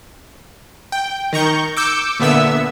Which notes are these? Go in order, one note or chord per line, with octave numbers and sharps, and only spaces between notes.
G5
D#3 A#5 C#6 G6
D6 E6 G6 C#7
A#2 D3 B3 E5 E6